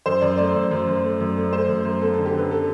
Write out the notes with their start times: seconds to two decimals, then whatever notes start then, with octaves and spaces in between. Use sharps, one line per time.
0.06 F#2 C5
0.21 F#2 D5
0.37 A3 D5
0.55 F#2
0.71 F#2
0.87 F#2
1.03 A3
1.20 F#2
1.36 A3
1.53 A3 C5
1.69 F#2
1.85 F#2
2.01 B3 A4
2.14 D3 A4
2.26 G4
2.34 D3 B4
2.51 A4